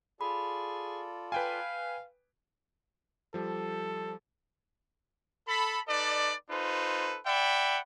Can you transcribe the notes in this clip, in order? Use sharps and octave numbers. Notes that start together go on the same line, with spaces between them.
F4 G#4 A4 D5 B5
B4 F5 G5 G#5
F3 G3 A4
A4 B5
D#4 A4 B4 D5
D#4 F4 A4 B4 C5
D5 E5 F#5 G5 B5